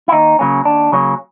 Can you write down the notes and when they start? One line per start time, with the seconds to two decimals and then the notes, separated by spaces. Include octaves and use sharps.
0.08 E4
0.12 D#2 D#4
0.39 C#3 F#3 A#3 C#4
0.65 D#2 D4
0.92 C#3 F#3 A#3 C#4